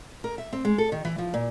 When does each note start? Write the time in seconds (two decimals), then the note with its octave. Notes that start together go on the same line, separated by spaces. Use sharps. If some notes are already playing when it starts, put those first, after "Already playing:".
0.24 A#4
0.38 E5
0.53 C4
0.65 G#3
0.78 A4
0.92 D#3
1.05 E3
1.18 F3
1.34 A#2